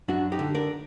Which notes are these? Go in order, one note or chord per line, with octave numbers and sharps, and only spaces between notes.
F#2 D4 F#4
D#4 G4
D3
A#4 D5